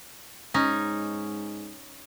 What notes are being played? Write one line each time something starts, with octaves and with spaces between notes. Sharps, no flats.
G#2 C#4 D#4